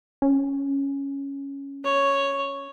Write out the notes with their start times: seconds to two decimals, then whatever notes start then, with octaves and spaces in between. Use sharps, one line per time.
0.22 C#4
1.84 C#5